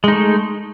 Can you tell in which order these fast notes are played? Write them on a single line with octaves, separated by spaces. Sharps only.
G#3 D#4 A3